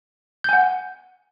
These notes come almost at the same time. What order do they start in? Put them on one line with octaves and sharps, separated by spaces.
G6 G#5 F#5